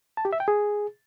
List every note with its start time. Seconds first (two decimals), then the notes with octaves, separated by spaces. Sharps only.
0.17 A5
0.25 G4
0.33 E5
0.40 G5
0.48 G#4